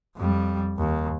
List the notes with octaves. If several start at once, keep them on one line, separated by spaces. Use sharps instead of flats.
F2 G3
D#2